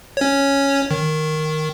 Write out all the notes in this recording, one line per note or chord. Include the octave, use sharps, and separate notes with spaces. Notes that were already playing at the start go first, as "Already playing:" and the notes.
C#4 C#5
D#3